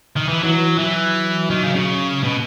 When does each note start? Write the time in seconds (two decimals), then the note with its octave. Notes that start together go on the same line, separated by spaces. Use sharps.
0.16 D#3
0.29 E3
0.43 E3 F#3
0.78 E3 F#3
1.51 D#3
1.63 C#3
1.75 C#3
2.23 B2